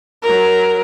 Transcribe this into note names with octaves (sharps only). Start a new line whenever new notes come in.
F#3 A#4